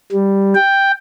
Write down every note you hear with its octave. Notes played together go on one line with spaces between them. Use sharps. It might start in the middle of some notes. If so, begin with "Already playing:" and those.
G3
G5